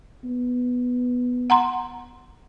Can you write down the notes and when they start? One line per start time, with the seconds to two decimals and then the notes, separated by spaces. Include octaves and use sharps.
0.24 B3
1.50 F#5 A#5 C6